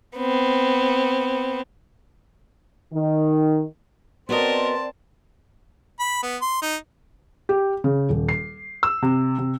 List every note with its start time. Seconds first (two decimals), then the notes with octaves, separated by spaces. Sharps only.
0.18 B3 C4
2.93 D#3
4.29 B3 C4 F#4 A#4 D5 D#5 A5 C6
6.00 B5
6.23 B3
6.42 C6
6.62 D#4
7.49 G4
7.84 C#3
8.09 D#1
8.29 C7
8.83 E6
9.02 C3
9.39 C3